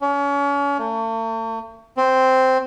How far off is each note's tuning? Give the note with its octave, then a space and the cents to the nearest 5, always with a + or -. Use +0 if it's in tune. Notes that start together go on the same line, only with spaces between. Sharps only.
C#4 +35
A3 +40
C4 -5